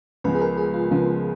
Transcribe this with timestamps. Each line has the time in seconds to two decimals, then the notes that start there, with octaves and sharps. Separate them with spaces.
0.24 C#2 C#3 F3 G#3 B3 B4
0.35 G#4
0.42 A#4
0.57 G#4
0.74 F4
0.91 C#2 C#3 F3 G#3 B3 F4